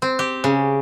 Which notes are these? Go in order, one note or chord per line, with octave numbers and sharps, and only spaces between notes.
C4
G4
C#3